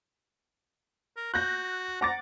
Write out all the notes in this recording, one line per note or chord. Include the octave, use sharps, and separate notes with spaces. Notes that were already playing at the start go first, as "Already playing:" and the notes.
A#4
F#4 F#6 G6 A#6
F#5 A#5 D6 A6